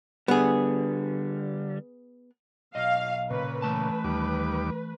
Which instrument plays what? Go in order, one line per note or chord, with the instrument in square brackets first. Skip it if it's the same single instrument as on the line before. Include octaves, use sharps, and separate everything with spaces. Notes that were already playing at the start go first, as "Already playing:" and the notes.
[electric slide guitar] D3 G3 [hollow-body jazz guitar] B3 G#4
[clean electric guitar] B1 D#5 [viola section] F5
[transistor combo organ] A#2 C#3 [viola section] B4
[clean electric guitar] E3 A3 A5 [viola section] B4
[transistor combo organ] D#2 G3 D6